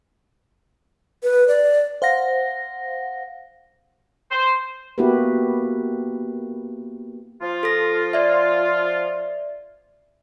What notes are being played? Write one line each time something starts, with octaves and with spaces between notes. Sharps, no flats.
B4
D5
C5 F5 F#5 A#6
C5
A#3 B3 E4 F#4 G4 B4
F3 F4
A4 A#6
D5 E5